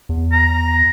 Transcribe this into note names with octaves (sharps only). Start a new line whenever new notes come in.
E2
A#5